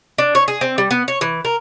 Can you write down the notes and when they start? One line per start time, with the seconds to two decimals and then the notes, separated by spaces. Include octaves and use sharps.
0.18 D4
0.35 C#5
0.48 G#4
0.61 C4
0.78 G3
0.91 B3
1.08 C#5
1.21 E3
1.45 A#4